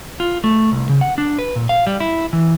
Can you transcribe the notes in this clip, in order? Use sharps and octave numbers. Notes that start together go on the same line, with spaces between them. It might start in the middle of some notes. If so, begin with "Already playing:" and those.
F4
A3
C2
C#3
F#5
D4
B4
A#2
F5
G3
E4
E3